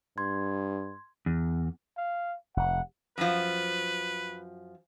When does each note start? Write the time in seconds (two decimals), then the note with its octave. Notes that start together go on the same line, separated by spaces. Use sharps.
0.18 G2 C6 G#6
1.26 E2
1.97 F5
2.57 F1 F#5
3.18 F#2 F3 B4